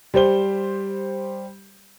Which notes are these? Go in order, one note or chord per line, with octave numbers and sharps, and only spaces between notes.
G3 G4 C5 G7